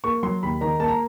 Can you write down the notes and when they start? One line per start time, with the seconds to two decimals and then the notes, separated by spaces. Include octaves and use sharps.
0.04 A#3 C#6
0.23 F#3 C6
0.43 D#2 B5
0.61 D#3 A#5
0.80 A#3 A5
0.88 A#5